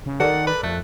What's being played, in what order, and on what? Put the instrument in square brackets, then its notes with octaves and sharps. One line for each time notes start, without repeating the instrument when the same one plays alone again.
[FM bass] C#3
[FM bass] D#3 [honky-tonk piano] A4 A#4 D5 [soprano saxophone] F#5
[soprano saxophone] B4
[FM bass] F2 [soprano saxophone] A3 [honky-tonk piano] F#6